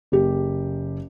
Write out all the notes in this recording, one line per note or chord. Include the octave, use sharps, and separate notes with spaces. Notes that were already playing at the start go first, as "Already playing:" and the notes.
F#1 G4